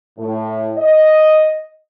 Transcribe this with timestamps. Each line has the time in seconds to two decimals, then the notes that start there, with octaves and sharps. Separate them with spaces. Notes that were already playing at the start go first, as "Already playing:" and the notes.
0.19 A2
0.77 D#5